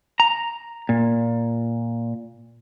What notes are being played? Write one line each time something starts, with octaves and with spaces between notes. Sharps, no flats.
A#5
A#2